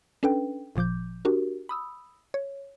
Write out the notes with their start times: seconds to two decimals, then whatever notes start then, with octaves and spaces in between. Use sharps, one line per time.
0.23 C#4 D4 A4 B4 G5
0.76 G1 A#2 F3 D6 G6
1.25 D4 F#4 G4 A#4
1.69 B5 D#6 E6
2.34 C#5